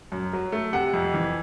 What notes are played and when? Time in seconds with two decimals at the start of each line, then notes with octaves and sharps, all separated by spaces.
0.12 F#2
0.33 F#3
0.52 A3
0.73 C3 F#5
0.93 F2
1.14 E3